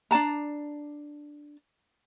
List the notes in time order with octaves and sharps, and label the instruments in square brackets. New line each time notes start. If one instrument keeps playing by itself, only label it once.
[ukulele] D4 D5 A5 A#5